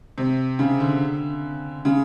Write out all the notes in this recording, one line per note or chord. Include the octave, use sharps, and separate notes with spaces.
C3
C#3
D3
C#3